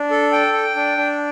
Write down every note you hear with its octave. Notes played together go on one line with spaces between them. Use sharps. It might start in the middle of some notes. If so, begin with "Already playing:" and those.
Already playing: D4
A4
G5
G5
D4
D4